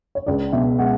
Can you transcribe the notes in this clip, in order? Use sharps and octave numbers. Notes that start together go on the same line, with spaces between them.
C#5
C#2 D5
B2 E5
G#3 F#5